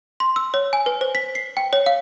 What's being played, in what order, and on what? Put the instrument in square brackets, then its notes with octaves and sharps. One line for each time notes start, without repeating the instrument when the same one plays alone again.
[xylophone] C6
E6
C#5
G#5
B4
C5
B6
C7
G5
C#5
F5